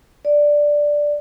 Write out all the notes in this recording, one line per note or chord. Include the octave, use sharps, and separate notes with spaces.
D5